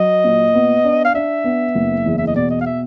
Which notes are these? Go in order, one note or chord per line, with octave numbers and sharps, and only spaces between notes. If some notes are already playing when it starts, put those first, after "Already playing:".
Already playing: F#3 D#5
A#2
B3
D4
F5
D4 E5
B3
F#1
E2
E5
D#5
B2 D5
D#5
F5
E5